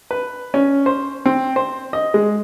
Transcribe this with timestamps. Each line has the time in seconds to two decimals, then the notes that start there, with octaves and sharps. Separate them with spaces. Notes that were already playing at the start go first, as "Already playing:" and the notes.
0.11 B4
0.54 C#4
0.86 C5
1.26 C4
1.56 C5
1.93 D#5
2.14 G#3